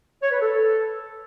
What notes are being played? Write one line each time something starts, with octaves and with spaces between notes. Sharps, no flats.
C#5
B4
A4